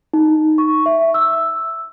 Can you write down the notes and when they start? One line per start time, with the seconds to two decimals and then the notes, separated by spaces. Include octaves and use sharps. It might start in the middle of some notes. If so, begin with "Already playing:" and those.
0.13 D#4
0.58 C#6
0.86 E5
1.14 E6